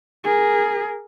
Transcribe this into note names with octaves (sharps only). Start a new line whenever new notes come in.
G#4 A#4